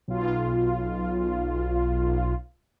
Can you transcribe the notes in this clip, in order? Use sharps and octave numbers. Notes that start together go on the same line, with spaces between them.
B1 F4